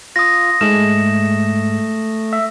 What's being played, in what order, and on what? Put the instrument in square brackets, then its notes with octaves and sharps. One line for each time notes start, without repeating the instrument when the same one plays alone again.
[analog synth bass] F4 [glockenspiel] D#6 A#6
[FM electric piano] G#2 G#3 [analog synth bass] A3 [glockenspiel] E7
[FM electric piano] E5